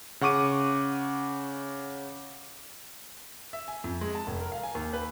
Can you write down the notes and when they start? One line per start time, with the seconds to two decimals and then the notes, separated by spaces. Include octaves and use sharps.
0.21 C#3 F#5 C#6 D6 D#7
3.53 E5
3.68 G#5
3.84 F2
4.01 G#3
4.15 A5
4.27 F1
4.40 A#4
4.52 F5
4.63 G#5
4.75 D#2
4.93 B4